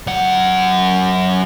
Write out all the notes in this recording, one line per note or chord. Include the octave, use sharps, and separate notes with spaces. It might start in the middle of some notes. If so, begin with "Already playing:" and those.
F#2 F#5